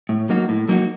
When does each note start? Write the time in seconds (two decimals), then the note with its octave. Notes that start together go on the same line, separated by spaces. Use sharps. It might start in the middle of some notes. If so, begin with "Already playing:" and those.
0.09 A2
0.29 F#3 A#3 D#4 F#4
0.49 A2
0.68 F#3 A#3 D#4 F#4